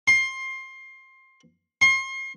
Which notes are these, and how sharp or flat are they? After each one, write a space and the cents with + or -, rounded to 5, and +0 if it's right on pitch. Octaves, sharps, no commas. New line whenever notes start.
C6 +20
C6 +35